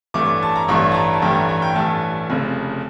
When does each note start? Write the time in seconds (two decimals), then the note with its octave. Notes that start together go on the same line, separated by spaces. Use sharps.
0.14 A1 G2 E3 A3 D6
0.43 A5
0.56 A#5
0.68 A1 G2 E3 A3 C#6
0.92 A5
0.95 A#5
1.14 A5
1.22 A1 G2 E3 A3 G5
1.35 A#5
1.49 A#5
1.62 G5
1.75 A1 G2 E3 A3 A5
2.30 F1 F2 C#3